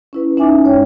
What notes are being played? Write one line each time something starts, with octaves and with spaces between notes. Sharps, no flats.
C#4 E4 B4
C#4 D#4 E5 G#5 D6
G2 G#3 C#5 G5